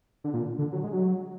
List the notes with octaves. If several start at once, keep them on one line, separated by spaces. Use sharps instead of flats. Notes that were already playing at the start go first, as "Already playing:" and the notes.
D3
A#2
D3
F#3
G#3
F#3